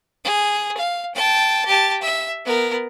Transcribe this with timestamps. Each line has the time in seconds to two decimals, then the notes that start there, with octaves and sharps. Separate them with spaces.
0.24 G#4
0.77 F5
1.14 G5 A5
1.66 G4 A5
2.02 E5
2.45 B3 A#4